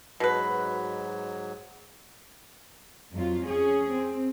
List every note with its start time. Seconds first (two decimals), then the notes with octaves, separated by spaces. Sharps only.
0.20 G#2 B2 F#3 B4
3.13 F2 F#3 F4
3.43 C#4 G#4
3.91 C4